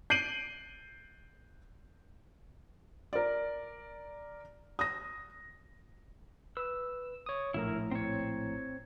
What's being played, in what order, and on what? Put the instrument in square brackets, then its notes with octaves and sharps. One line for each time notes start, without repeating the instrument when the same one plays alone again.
[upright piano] G6 C7 D7 D#7 F#7
[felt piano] A#4 D5
D#6 A#6
[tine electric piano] B4 [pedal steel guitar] E6
[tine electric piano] C#5 D#6
[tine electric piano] A#1 A2 A#5 [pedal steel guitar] E4 A#4
[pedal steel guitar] C4 C#5